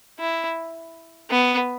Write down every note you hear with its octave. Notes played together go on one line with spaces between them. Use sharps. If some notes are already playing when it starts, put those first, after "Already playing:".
E4
B3